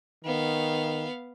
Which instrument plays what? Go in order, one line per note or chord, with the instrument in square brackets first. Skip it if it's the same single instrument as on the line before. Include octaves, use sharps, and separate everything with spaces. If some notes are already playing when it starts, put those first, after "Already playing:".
[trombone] D#3 [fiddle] B3 F5